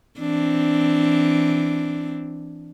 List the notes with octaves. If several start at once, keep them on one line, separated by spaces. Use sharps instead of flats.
E3 C4 D4